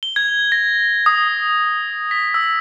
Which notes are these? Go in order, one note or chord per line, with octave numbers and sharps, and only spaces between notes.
G7
G#6
A#6
D#6
B6
E6